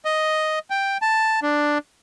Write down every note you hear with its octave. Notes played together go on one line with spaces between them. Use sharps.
D#5
G5
A5
D4